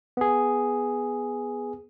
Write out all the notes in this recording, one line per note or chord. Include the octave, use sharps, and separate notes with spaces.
B3 G#4